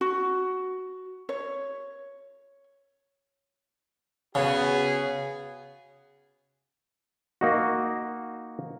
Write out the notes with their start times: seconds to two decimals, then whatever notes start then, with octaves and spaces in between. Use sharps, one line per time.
0.01 F#4
1.29 C#5
4.35 C#3 B3 F#4 G#4
7.41 A#3 D#4 F#4